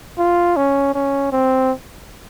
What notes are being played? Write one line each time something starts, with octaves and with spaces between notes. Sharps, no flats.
F4
C#4
C#4
C4